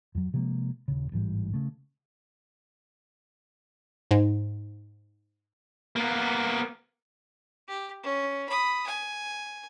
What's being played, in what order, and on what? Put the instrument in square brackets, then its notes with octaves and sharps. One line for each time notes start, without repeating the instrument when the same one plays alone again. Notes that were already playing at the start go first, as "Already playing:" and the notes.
[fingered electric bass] F2 F#3
C3 F3 G#3 A#3
D#1 C#3
A1 G#2 E3 G3
C#3 A3
[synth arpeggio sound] G#2
[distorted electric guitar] A#3 B3
[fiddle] G4
C#4
B5 D#6
G#5